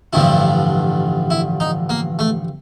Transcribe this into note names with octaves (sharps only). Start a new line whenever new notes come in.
A1 G2 D3 F3 E4
E4
D#4
A#3
A3